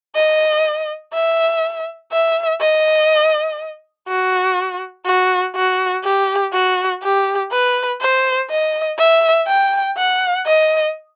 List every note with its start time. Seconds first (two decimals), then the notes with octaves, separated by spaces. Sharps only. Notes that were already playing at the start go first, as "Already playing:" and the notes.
0.15 D#5
1.14 E5
2.12 E5
2.60 D#5
4.08 F#4
5.06 F#4
5.55 F#4
6.04 G4
6.53 F#4
7.03 G4
7.51 B4
8.01 C5
8.50 D#5
8.98 E5
9.47 G5
9.97 F#5
10.46 D#5